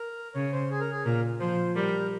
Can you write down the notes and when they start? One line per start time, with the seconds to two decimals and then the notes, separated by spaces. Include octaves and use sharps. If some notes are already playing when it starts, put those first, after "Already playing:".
Already playing: A#4
0.35 C#3 C#5
0.53 C5
0.70 G#4
0.80 A#4
0.90 G#4
1.05 A#2 A#4
1.40 F3 C5
1.75 G3 A#4